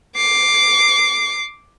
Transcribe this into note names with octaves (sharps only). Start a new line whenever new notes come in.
D6 C7